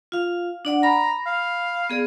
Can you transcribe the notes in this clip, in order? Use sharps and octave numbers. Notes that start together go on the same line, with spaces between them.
F4 F5
D4 D5 F#5
A#5 B5
F5
B3 G#4 D5